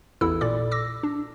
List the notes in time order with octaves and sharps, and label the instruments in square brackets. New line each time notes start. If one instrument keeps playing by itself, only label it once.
[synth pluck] A1 E2 E4 A4 E6
A#2 A4 D5 D6
D6 E6 A#6
D4